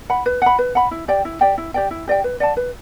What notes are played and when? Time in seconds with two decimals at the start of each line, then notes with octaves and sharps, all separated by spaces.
0.10 F#5 B5
0.26 B4
0.42 F#5 B5
0.59 B4
0.75 F#5 B5
0.91 E4
1.08 G4 D5 G5
1.25 E4
1.41 G4 D5 G5
1.58 E4
1.74 G4 D5 G5
1.91 E4
2.07 G4 D5 G5
2.24 B4
2.40 D5 F#5 A5
2.57 B4